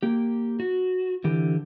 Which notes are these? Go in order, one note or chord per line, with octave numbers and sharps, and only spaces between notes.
A#3 G4
F#4
D3 E3 G4